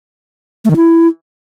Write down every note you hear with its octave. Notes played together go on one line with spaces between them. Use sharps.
A3
D#3
E4